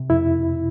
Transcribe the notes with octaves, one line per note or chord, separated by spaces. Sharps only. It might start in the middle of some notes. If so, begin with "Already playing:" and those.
Already playing: C3
F2 E4